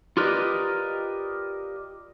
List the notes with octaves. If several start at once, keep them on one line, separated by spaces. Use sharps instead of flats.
F4 G4 A#4 B4 D5 D#5